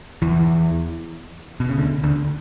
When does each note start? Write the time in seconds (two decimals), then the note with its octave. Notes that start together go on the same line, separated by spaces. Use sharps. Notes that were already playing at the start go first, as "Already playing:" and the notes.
0.22 E2 E3
1.60 B2
1.69 C#3
1.78 D2 D3
2.04 D2 D3